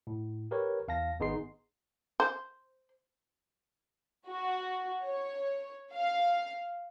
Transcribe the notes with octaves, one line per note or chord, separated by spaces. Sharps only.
A2
G4 A#4 B4 C#5
E2 F5 A5 A#6
G#1 B3 D#4 G#4 C6 C7
C5
F#4
C#5
F5